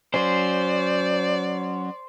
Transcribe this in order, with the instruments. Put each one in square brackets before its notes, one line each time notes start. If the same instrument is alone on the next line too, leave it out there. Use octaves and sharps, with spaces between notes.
[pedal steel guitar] F#3 C#4 [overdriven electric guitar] C5 [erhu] D5